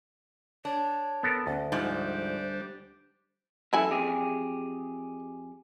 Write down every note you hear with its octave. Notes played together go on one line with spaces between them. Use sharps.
D4 C#5
B3 A4 A#4
D2 C#4
G#2 F3 G3 D4 C5
F#2 E3 E4 A4 G#5
F2 G4 G#4